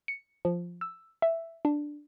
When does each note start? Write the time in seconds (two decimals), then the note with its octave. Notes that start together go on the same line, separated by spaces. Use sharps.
0.08 C#7
0.45 F3
0.81 E6
1.22 E5
1.65 D4